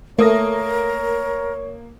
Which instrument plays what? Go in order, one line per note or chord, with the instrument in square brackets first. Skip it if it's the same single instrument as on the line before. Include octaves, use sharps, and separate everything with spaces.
[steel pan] A3 [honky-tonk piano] A#3 D#6 A#6 [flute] A#4 [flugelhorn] C#5